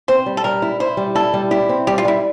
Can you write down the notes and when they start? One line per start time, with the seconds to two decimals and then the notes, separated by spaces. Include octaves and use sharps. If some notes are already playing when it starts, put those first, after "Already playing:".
0.08 C4 C5
0.26 G3
0.37 A4
0.44 G3 A#4
0.62 E4
0.80 E4 C5
0.97 G3
1.15 E4 A4
1.34 G3
1.51 E4 G4
1.69 C4
1.87 G3 G4
1.98 F4
2.05 G3 E4